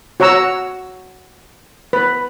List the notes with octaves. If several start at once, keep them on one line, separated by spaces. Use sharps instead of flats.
F#4 C#5 F#5 A#5 E6
B4